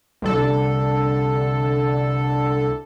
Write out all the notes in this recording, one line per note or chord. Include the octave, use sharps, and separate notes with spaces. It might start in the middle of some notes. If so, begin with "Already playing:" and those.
C2 D3 A4